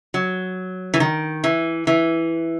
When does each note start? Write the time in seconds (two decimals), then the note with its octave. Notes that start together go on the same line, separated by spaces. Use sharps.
0.14 F#3
0.94 E3
1.00 D#3
1.44 E3
1.87 E3